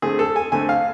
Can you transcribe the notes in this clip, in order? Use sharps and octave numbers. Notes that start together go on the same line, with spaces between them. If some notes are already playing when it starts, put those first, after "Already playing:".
D3 A3 C4 G#4
A4
G#5
D3 A3 C4 G#5
F5